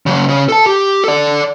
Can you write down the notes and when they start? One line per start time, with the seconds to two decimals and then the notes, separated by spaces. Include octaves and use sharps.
0.06 C#3 F#3
0.28 C#3
0.49 A4 A5
0.66 G4
1.04 A4 D5